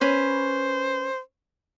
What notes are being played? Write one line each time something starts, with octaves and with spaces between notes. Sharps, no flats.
C#4 B4 C5